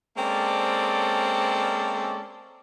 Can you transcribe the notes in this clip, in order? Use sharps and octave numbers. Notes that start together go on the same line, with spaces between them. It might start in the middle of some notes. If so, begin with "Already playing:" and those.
G#3 A#3 C4 C#4 A4 D5